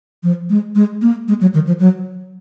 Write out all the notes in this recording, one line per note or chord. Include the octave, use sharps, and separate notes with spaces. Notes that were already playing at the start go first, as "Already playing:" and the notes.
F3
G#3
G#3
A#3
G#3
F#3
D#3
F3
F#3